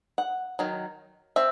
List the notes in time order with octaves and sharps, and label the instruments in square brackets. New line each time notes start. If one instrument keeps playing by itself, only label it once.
[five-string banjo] F#5
D#3 F#3
C4 E5